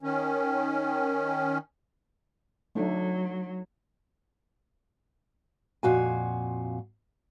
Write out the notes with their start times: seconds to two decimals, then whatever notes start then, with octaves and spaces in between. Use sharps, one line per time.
0.02 D#3 C#4
2.75 F#3 A3 D4 D#4
5.83 F2 A#2 F#4 F5 G#5